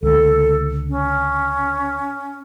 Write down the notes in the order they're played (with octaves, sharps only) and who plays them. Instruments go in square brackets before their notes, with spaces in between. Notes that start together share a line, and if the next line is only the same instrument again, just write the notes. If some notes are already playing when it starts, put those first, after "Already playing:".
[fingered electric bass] C#2 D3 [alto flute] A4
[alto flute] C#4